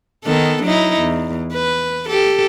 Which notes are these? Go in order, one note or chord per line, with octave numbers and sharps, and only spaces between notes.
D#3 B3 A4
F#3 D#4 E4
E2
B4
G4 A4